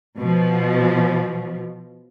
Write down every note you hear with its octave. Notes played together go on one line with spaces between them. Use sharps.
B2 F3